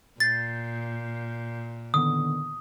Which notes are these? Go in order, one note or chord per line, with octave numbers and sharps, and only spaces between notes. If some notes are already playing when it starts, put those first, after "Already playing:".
A#2 G6 A6 C7
D3 D#3 B3 D#6